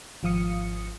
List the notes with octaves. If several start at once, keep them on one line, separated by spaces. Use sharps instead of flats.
G#1 F3 F5 D#6 C#7